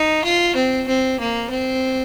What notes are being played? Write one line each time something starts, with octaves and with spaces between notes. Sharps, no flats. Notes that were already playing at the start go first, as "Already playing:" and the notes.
Already playing: D#4
F4
C4
C4
A#3
C4